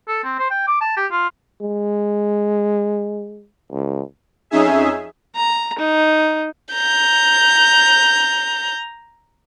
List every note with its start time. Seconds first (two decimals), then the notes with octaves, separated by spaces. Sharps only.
0.08 A4
0.24 C4
0.39 C5
0.50 G5
0.67 D6
0.81 A5
0.97 G4
1.11 F4
1.61 G#3
3.71 C#2
4.50 F2 C#4 D#4 G#4 E5
5.36 A#5
5.79 D#4
6.74 A#5 G6